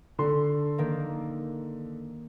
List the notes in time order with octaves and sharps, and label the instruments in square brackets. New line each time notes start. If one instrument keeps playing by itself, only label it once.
[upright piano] D3 A4 C6
[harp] D#3 A#3